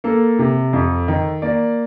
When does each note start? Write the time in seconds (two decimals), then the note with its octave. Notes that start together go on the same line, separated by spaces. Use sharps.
0.04 A#3 A4
0.39 C3
0.73 F2
1.08 D#3
1.42 A#3 D5